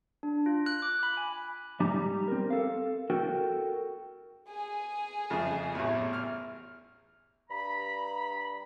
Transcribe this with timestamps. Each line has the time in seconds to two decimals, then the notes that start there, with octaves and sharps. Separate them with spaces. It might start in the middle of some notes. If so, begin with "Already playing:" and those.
0.23 D4
0.46 F4
0.66 F#6
0.82 D6
1.03 B5
1.17 G#5
1.80 G#2 G3 D#4 G4 G#5 A#5
2.28 C4 A#4
2.50 A4 F5
3.10 F#4 A4 A#4 G5
4.48 G#4 G#5
5.30 F2 C#3 E5
5.75 A1 E2
6.13 F6
7.50 G2 A#5 B5